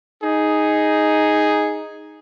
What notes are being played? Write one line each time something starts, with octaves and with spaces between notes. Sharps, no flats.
D#4 G#4